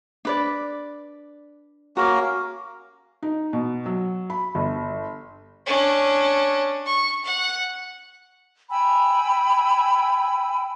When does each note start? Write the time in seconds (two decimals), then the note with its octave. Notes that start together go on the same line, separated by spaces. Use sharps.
0.25 D4 B4 D5
1.97 A#3 C#4 F#4 A#4 F5
3.23 D#4
3.53 B2
3.86 F#3
4.30 B5
4.55 G1
5.66 C#4 D4
6.86 C#6
7.25 F#5
8.70 G5 G#5 B5 E6